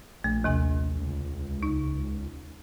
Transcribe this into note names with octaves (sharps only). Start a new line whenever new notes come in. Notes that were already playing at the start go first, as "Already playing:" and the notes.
A#1 A3
D#2 C3 G#5
C#2
D#4